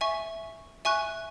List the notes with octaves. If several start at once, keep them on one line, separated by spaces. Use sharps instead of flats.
E5 G#5 C#6
E5 G#5 C#6 F#6